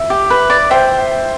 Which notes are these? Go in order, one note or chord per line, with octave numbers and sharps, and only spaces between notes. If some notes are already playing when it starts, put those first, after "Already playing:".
Already playing: E5
G4
B4
D5
C5 E5 G5